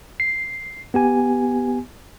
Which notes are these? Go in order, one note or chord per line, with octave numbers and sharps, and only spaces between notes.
C7
B3 G4 G#5